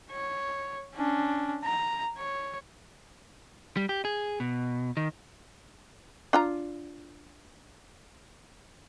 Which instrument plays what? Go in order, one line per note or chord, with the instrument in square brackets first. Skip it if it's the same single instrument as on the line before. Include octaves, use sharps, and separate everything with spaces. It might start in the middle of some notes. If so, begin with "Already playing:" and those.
[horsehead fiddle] C#5
C#4 D4
A#5
C#5
[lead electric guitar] G3
G4
G#4
B2
D#3
[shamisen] D4 F4 A#5